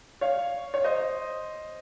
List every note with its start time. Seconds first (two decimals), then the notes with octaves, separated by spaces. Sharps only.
0.21 C#5 F5
0.74 C#5
0.84 C5 D#5